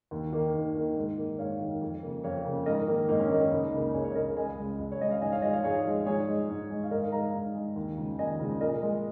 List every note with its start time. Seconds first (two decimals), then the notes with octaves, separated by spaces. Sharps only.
0.11 D#2
0.33 D#3 A#3
0.53 D#2
0.76 D#3 A#3
0.97 G#2
1.18 D#3 A#3
1.38 G#2 C#5 F5
1.60 D#3 A#3
1.81 F2
2.02 C#3 A#3
2.24 F2 C#5 F5
2.45 C#3 A#3
2.66 G#2 A#4 D#5
2.87 D#3 A#3
3.08 G#2 A#3 D#4
3.20 C#4
3.30 D#3 A#3 D#4
3.41 A#3 D#4
3.51 C#2
3.73 C#3 A#3
3.94 C#2 G#4 C#5
4.04 G#4 C#5
4.15 C#3 A#3 A#4 D#5
4.36 C#2 D#5 G#5
4.58 C#3 G#3
4.79 C#2
4.92 C#5
5.00 C#3 G#3 D#5
5.11 F5
5.21 G#2 D#5 G#5
5.32 C#5 F5
5.42 F3 G#3 D#5 G#5
5.53 C#5 F5
5.63 G#2 G#4 C#5
5.85 F3 G#3
6.06 G#2 G#4 C#5
6.28 G#3
6.49 G#2
6.70 G#3
6.83 F5
6.91 G#2 A#4 D#5
7.12 G#3 F5 A#5
7.33 G#2
7.55 G#3
7.76 D#2
7.98 C#3 F3 G#3
8.19 D#2 D#5 G#5
8.39 C#3 F3 G#3
8.61 A#2 A#4 D#5
8.82 G#3